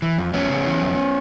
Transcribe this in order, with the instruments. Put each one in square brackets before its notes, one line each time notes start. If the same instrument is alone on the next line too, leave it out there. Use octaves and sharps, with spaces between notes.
[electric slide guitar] E3
F2
F2 B3 C#4
C#3
E3
F2